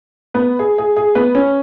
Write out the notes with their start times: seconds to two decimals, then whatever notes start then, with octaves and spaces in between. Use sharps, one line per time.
0.34 B3 B4
0.59 G#4
0.78 G#4
0.96 G#4
1.15 B3 B4
1.35 C#4 C#5